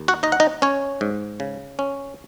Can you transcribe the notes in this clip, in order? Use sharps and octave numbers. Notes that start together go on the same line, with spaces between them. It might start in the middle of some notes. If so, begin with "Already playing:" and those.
Already playing: D#2
F#4 F#5
D#4 D#5
F#5
D#4 D#5
C#4 C#5
G#2
C#3
C#4